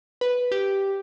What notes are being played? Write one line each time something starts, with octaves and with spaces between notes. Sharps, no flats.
B4
G4